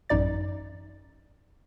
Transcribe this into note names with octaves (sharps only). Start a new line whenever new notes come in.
A1 F#2 D#4 D5 A6